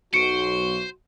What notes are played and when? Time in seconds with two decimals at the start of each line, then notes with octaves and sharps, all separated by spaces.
0.14 B1 F#4 C5 C#7 D7